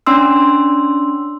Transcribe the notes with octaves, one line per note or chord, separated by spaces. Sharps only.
C#4 D4 C6 E6